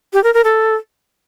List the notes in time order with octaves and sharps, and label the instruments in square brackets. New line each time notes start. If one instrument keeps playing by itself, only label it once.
[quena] G4
A#4
A#4
A4